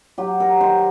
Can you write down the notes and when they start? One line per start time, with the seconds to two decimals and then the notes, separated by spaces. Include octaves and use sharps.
0.18 F#3 G4
0.40 A#4
0.61 D#3 C5